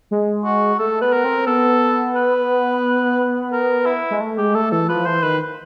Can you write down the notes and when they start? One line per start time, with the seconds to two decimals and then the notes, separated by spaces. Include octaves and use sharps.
0.11 G#3
0.45 F#4
0.79 A3 A4
1.01 B3 B4
1.13 A#4
1.24 C4
1.47 B3 A4
2.15 B4
3.52 A#4
3.86 E4
4.11 G#3
4.21 A3
4.38 G#3 G4
4.55 A3 A4
4.71 E3 A4
4.88 F3 B4
5.06 E3 C5
5.23 D#3 B4